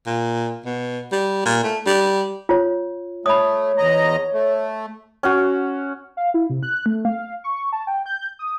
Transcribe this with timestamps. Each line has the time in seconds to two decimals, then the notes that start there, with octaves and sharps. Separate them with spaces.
0.07 A#2
0.65 B2
1.12 G3
1.45 A#2
1.63 A3
1.86 G3
2.49 F4 C#5
3.26 A3 C#5 B5 D#6
3.78 E2 D#5 A#5
4.33 A3
5.23 C#4 F#4
6.17 F5
6.34 E4
6.50 C3
6.63 F#6
6.86 A3
7.05 F5
7.44 C#6
7.72 A5
7.87 G5
8.06 G6
8.39 D#6